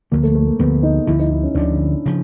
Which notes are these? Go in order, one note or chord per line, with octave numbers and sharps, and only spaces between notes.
D2 D3 F3 A#3
A3
A3
A#3
D2 D3 F3 B3
D#4
D2 D3 F3 E4
D#4
E4
C#4
D2 D3 F3 D4
C#3 F3